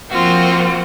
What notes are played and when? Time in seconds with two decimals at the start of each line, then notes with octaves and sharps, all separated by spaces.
0.11 F3 A#3 C4 F4 F#4